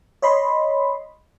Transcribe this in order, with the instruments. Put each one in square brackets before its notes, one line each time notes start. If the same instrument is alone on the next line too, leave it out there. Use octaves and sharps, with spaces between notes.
[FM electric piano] C#5 D#5 B5 C6